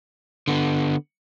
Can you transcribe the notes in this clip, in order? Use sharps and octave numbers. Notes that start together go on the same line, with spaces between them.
D3 B3